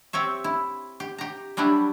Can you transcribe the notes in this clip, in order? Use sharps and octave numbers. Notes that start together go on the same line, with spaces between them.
C4 G4 C#5 E5
E4
G4
G4 A#5
F#3 G3 D4 E4 G4